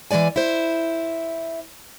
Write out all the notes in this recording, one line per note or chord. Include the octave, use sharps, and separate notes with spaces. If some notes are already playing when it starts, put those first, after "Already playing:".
E3 F#3 G#3 D5 G#5
E4 C5